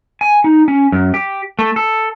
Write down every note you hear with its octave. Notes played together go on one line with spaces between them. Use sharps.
G#5
D#4
C#4
F#2
G4
A3
A4